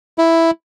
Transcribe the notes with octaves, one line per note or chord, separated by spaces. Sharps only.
E4